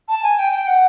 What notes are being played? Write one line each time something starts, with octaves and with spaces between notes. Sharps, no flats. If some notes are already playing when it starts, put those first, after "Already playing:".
A5
G#5
G5
G5
F#5